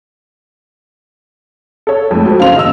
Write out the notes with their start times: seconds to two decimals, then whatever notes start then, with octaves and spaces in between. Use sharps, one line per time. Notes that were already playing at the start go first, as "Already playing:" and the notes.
1.87 A4 C#5
2.11 F2 G#3 A3
2.25 F#4 C5
2.40 F#1 C#3 F5 C6 F7
2.56 D#1 D#5 E6